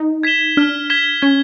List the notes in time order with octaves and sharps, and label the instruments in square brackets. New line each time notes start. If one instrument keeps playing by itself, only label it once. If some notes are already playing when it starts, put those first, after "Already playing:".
Already playing: [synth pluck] D#4
[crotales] G#6 B6 E7 G7
[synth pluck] D4 [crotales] F6
[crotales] G#6 B6 E7 G7
[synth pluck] C#4 [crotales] G#6